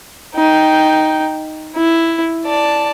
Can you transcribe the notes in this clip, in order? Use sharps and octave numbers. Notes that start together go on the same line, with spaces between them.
D#4 G5
E4
D5 A5